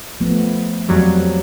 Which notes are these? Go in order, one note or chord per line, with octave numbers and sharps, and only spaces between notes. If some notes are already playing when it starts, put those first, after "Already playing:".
F3 A3 B3
F2 F#3 G3